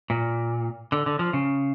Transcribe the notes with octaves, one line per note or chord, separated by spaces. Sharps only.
A#2
D3
D3
F3
C#3